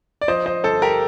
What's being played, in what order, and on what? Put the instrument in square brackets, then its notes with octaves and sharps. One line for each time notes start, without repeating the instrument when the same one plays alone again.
[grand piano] D5
F3 C5 D#5
C5 D#5
G1 A4 C5
G4 A#4